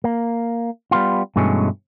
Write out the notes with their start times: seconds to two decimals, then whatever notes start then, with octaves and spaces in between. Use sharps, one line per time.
0.04 A#3
0.91 G3 B3 F4
1.36 G2 B2 E3 G#3 A3 C#4